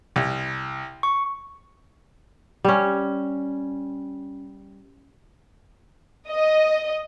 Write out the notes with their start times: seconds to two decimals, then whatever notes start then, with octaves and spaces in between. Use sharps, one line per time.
0.16 C2
1.03 C#6
2.65 G3 C#4
6.28 D#5